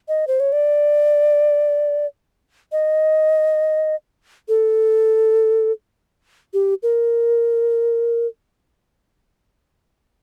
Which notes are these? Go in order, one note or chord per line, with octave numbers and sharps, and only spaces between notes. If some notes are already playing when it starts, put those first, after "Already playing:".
D#5
C5
C#5
D5
D#5
A4
G4
A#4